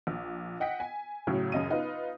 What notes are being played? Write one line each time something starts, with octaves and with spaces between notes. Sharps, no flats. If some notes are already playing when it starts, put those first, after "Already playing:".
A#1
D#5 F#5 G5 B6
G#5
A2 C#3 F#3
F#2 C#3 D#5 D#7
B3 D#4 F4 B4